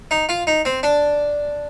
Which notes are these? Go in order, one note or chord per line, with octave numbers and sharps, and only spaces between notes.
D#4
F4
D#4
C4
D4